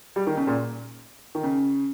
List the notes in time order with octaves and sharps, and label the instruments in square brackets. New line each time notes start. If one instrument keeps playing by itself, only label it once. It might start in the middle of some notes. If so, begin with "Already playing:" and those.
[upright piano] G3
D#3
C#3
A#2
D#3
C#3